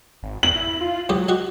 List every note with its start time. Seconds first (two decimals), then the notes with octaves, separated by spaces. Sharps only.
0.23 G#1
0.43 E2 F#7
0.55 E4
0.81 F4
1.09 C#2 F#3 G4 D#6
1.28 F#4 G4 D#5